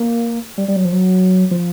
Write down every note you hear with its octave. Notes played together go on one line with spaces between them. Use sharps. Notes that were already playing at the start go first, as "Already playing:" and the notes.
Already playing: A#3
G3
G3
F#3
F3
F#3
F3